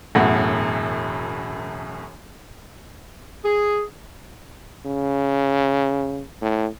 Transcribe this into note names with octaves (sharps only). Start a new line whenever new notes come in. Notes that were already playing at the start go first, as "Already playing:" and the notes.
E1 F#2 A2 F#5
G#4
C#3
A2